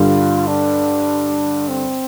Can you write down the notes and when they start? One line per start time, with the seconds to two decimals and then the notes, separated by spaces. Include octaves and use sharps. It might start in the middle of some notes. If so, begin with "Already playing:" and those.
Already playing: G2 D3 G3 F4
0.47 D4
1.68 C4